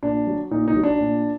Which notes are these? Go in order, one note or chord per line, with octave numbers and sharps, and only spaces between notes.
A#2 D4
F#3
A#2 D#4
D#4
F#3
D4
A#2